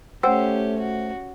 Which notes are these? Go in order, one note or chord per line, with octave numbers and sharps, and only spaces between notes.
A3 C#4 G4 C5 F#5 G5 E6
F#4